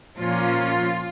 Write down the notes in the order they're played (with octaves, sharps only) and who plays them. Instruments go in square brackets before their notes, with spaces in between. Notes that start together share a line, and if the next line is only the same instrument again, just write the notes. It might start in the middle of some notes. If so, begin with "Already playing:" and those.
[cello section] A#2 F3 A#3 C#4 F4